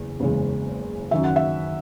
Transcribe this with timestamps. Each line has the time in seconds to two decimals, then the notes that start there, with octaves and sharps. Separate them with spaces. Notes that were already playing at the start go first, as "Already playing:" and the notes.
Already playing: F#1 E2
0.20 F#1 E2 C#3 G#3
1.11 F#2 D#3 F#3 E5
1.24 F#5
1.36 E5